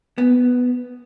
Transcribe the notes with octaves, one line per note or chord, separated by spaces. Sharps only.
B3